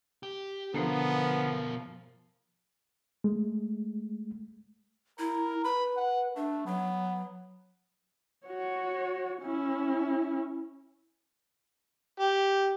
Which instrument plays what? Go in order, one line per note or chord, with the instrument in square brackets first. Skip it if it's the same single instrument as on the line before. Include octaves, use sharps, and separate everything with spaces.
[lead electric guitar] G4
[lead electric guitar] B2 A#4 [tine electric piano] D3 [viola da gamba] F3 [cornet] B3
[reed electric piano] G#3 A3
[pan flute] E4 [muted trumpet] A#4
[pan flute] B4 [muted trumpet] B5
[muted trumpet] F#5
[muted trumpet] A3 [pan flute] D4
[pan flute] F#3 [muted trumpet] B3
[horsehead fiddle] F#4 C#5
C#4 E4
[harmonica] G4